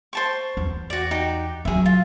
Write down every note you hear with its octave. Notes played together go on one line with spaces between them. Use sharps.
C5 A5 C#6
E2
F#4 D5
D#4 F#4 G4
D#3 F#3 G#4 E5
F4